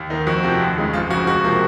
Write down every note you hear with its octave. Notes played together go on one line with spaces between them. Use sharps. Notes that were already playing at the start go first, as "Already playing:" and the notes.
Already playing: D#2
D#3 A#3 D#4
F2 F#4
C3 F3 C4
D#2
C#3 G#3 D#4
F#1 F4
F2 C#3 F#4
C#2 F#4
C3 F3 A#3